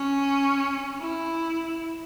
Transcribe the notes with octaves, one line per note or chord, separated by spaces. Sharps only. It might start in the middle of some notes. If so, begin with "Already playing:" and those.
Already playing: C#4
E4